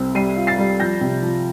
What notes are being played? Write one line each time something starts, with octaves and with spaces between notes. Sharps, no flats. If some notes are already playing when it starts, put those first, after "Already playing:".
Already playing: C2 C4
G3 C7 D#7
F4
A6 C7
G3
F3 G6 A#6
C3
F3